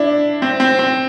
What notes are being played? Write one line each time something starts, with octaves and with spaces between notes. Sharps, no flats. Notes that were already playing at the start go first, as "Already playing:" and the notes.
Already playing: D4 E4
C4
C4
C4